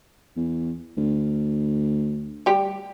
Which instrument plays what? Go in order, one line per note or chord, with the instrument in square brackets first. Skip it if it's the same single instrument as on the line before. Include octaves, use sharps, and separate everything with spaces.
[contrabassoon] E2
D2
[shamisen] G3 G4